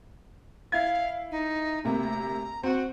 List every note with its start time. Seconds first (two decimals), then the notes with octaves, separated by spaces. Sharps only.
0.72 E4 F5 G#6
1.31 D#4
1.84 D2 C3 A#3 A#5
2.63 C4 F#4